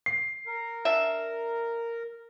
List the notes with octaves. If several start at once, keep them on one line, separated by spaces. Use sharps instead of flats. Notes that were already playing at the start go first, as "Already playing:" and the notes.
C7
A#4
D4 E5